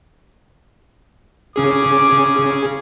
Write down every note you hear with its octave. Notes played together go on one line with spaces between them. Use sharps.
C#3 C#4 G#4 D6